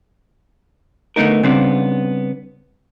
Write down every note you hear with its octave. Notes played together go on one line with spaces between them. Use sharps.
D3 A3 B3 D#4 A#4
C#3 G3 B3 C4 D4